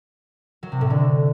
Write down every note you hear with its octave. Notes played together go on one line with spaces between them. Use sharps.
F#3
C3
A2
D3